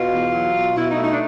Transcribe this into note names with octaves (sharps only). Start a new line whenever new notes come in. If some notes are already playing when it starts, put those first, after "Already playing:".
Already playing: B2 F4
E2
F#3
B2
B2 E4
D#4
A3
D#4
D4